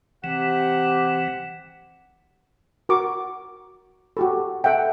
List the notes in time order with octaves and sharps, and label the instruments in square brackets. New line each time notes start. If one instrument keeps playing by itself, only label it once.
[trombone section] C3 G4 [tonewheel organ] E3 [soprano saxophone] F#5
[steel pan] F#4 A#4 C#6 D6
F#4 G4 A4
A4 E5 F#5 G5